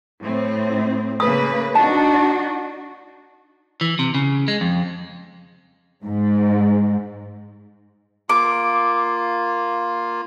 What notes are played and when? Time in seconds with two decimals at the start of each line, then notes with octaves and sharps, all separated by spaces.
0.20 A2 C4
1.20 C#3 A#3 B4 D#6
1.75 D4 D#4 F#4 A5
3.81 E3
3.99 C3
4.15 C#3
4.48 G#3
4.61 F2
6.04 G#2
8.30 A#3 F4 D6